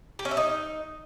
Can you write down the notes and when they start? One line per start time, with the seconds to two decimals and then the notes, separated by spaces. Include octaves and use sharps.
0.19 G4
0.25 C#4
0.31 E5
0.37 D#4